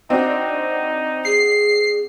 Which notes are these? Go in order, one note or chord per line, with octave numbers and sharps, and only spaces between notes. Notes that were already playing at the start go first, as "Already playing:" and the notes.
C4 D4 D#4 F#4
G#4 C7